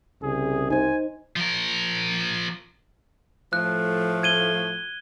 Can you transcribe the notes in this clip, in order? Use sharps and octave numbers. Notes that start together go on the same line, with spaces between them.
C2 C#3 G#4
D#4 C5 G#5
F3 A#4
A2 F3 A3 F#6
G#6 D#7 G7